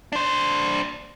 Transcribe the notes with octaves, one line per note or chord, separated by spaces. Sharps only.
D4 C5